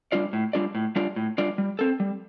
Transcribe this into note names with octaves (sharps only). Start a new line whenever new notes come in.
G3 D4 F4 D5
A2
G3 D4 F4 D5
A2
G3 D4 F4 D5
A2
G3 D4 F4 D5
G3
C4 A4
G3